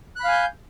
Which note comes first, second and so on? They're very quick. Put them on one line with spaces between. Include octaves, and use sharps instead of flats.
F#6 B5 F5 G#5 G6